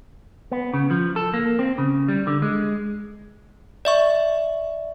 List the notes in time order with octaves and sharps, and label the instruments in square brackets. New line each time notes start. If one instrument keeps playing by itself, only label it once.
[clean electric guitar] B3
C#3
F3
A4
A#3
C4
C#3
G3
D3
G#3
[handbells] D5 E5 C#6